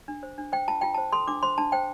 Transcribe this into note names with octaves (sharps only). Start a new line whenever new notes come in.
D4
C5
D4
C5 G5
F4 A5
F4 G5
C5 A5
A4 C6
D4 D6
C5 C6
D4 A5
C5 G5